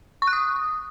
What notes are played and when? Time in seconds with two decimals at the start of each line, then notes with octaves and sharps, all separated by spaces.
0.22 C#6
0.27 F#6
0.33 D#6